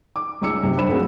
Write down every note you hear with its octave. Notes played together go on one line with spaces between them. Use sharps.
D6
C#2 C#4 D6 E6 C#7
B1 C3
F#2 D4 C5 C#5 B5 E7
A#1 A3 C4 F#4 G#4 A#4